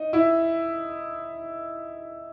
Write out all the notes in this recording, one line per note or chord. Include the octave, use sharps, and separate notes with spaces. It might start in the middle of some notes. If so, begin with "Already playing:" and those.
Already playing: D#4 D#5
E4 E5